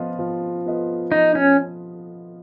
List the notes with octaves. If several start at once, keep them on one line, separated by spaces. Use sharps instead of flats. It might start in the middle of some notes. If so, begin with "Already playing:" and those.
Already playing: F3 B3 F4 B4 D#5
F3
B3 F4 B4 D#5
F3 D#4
C#4